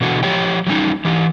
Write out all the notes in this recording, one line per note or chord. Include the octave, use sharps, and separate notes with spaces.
B2 D3 E3 F#4
F3 G3 G4 C#5 G5
F#3 G3 C#4 D#4
E3 G4